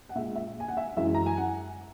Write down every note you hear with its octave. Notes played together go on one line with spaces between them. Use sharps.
F#5
A#2 G#3 E5
E5
G#5
F#5
E5
F#2 E3 G#3 E5
A#5
G#5
F#5